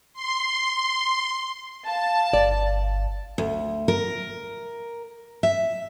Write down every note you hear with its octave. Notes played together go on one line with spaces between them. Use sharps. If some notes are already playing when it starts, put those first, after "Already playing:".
C6
F5 A5
G1 D5
D2
A#4
E5